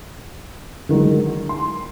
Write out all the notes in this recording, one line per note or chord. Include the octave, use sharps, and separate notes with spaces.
D3 D#3 F#3 G#3
C6